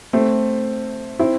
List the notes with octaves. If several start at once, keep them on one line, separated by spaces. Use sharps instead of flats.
A3 C4
C4 E4